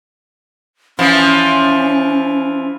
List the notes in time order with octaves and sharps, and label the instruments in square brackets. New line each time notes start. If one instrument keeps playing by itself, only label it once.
[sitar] E3 F3 [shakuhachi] C#4